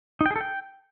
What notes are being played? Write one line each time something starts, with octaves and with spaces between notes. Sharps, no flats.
D#4
G5
G#4
A4
G5